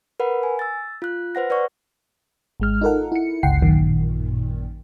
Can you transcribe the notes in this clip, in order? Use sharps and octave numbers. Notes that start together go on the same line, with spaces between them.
A#4 B4 F#5 B5
G#5
E6 A6
F4 F#6
B4 C5 F#5 A#6
B4 D5 F#5 C#6
G#1 G#3 F6
D#4 F4 A4 A#4 F#5
E4 C#7
G1 C#2 F#5 G5 C7
A1 F#2 A#2 D#3